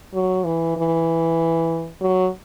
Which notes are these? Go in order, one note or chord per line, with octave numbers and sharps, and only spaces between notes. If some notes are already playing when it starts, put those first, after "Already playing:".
F#3
E3
E3
F#3